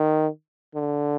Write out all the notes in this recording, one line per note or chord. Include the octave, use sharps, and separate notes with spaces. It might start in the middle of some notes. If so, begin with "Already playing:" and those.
Already playing: D#3
D3